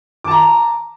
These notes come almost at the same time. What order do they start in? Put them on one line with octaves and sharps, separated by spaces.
D6 A5 A#5